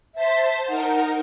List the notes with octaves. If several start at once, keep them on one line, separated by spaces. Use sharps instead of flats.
C5 E5 A5
D#4 A#4 F#5